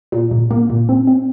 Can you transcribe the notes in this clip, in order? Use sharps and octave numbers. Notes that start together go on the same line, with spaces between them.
A#2
A#2
A#3
A#2
C4
C4